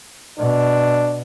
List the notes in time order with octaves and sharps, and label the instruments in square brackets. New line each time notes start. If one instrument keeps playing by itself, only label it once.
[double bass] B2 [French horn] D4